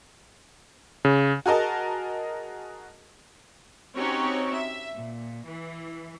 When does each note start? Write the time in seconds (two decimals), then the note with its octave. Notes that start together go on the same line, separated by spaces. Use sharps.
1.05 C#3
1.46 F#4 G#4 A#4 D#5 A5
3.96 C4 C#4 D#4 F#4 G4 C#5
4.53 E5
4.94 A#2
5.46 E3